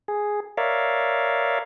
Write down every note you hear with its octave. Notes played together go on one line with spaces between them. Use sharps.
G#4
A#4 C#5 D5 E5 F5